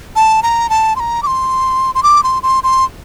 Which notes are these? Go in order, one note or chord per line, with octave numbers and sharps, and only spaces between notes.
A5
A#5
A5
C6
A#5
D6
C6
C6
D6
C6
C6
C6